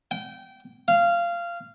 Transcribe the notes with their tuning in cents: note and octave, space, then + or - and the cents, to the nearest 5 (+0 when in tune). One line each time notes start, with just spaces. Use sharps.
G5 -25
F5 -15